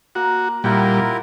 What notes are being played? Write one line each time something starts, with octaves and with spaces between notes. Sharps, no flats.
A#3 F#4 A#4
A#2 G3 E4 F4 A#4 F#5 G5 A#5